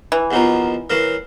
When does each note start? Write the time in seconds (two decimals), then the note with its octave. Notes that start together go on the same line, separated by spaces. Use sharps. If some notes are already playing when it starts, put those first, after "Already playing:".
0.12 E3
0.31 D#2 B2 F3 F#5 A#5
0.90 E3 F#3 A#3 F6 C7